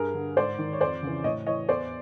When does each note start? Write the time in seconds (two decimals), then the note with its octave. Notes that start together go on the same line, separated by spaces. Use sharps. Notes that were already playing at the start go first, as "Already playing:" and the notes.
Already playing: G2 G#4 A#4
0.14 D3
0.36 G#2 C5 D5
0.58 D#3
0.73 C#5
0.80 F2 C5 D5
1.03 C#3 E3
1.24 A2 C#5 D#5
1.46 E3 C#5 D#5
1.69 E2 C5 D5